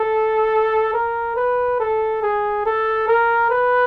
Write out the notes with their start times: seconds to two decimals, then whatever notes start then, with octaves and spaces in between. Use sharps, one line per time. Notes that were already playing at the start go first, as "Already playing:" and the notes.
Already playing: A4
0.93 A#4
1.36 B4
1.80 A4
2.23 G#4
2.65 A4
3.08 A#4
3.50 B4